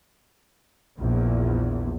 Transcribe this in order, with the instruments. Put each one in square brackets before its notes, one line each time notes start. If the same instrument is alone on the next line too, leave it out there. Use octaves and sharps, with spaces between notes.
[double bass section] A#1 E2